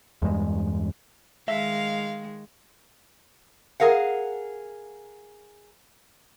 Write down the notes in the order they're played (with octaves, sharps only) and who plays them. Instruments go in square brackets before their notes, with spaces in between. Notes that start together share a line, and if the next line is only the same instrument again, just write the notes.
[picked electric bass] E2 G2 G#3
[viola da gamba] D#3 G#3 [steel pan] E5 [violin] F5
[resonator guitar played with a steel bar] G#4 A#4 F5 F#5